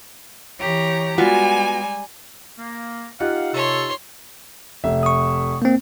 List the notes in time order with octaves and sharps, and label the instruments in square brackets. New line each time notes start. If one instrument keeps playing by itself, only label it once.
[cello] E3 G4 [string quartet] C#5 A#5
[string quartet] G3 G#5 [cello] G#3 [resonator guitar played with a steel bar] B3 F4 F#4
[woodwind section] A#3
[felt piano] D#4 F4 G4 [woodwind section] F5 F#5
[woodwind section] C3 A4 [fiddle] C#5 C6
[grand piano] F1 E5
[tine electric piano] C#6 D#6
A#3 C4